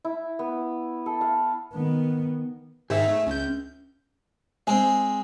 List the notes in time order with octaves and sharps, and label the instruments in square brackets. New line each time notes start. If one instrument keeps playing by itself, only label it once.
[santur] E4
B3
A4
F5
[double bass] D#3 B3
[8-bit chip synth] G#2 D#3 D#4 [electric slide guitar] G#4 E5
[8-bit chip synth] A3
[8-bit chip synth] C#2 G6 [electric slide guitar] C#4
[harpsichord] G#3 C4 [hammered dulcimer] G#5